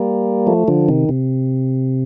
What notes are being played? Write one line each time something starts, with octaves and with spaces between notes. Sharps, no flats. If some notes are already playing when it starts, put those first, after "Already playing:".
Already playing: G3 A#3
F3 A3
D3 F3
C3 D#3
C3